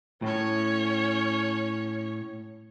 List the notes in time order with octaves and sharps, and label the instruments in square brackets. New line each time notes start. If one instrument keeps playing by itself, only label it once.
[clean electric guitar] A2 [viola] C#4 C#5